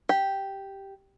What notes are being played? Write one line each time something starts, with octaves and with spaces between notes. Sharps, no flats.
G4